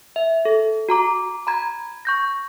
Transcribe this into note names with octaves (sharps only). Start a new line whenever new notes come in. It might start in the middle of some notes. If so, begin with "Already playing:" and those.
E5
A4
F#4 A#5 D6
A#5 B5 G#6
C#6 G6 A#6